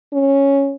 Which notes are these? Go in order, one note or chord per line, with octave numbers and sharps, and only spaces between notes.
C#4